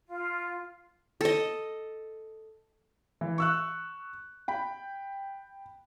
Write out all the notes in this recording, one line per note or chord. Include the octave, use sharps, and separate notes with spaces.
F4
A4 D#5
E3
C#6 E6 F#6
G5 B5